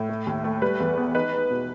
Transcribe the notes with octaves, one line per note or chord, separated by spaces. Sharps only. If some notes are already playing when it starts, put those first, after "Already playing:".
Already playing: A2
A3
D#2
A3
G3 B4
E2
B3
D#4 B4
D#4
B2